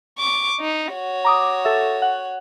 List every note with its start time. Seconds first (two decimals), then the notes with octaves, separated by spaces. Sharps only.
0.18 C#6 D6
0.60 D#4
0.93 F#4 C#5
1.25 A#5 D6 D#6
1.65 A4 E5
2.02 F#5